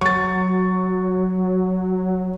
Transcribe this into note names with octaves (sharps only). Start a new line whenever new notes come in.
F#3 C#6 A6